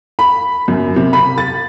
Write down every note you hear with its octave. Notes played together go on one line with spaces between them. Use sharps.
B5
F#2
C3
B5
A6